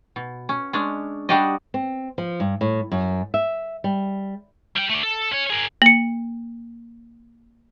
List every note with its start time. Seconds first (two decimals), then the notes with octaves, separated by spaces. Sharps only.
0.16 B2
0.49 C#4
0.73 G#3 C#4 D4
1.29 G3 D4 F#4 G4 D5 D#5
1.74 C4
2.18 F3
2.40 G2
2.61 A2
2.92 F#2
3.34 E5
3.84 G3
4.76 G3 G5
4.89 A3 D4
5.03 A4
5.32 C#4 C#5
5.50 G#4 A#4
5.82 A#3 C#7 F#7